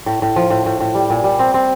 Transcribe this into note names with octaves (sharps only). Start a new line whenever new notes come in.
A2
A2
F3
A2
A2
A2
G3
A#2
G3
C4
C4